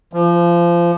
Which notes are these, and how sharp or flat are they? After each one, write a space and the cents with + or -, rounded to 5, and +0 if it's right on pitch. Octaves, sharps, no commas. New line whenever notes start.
F3 -25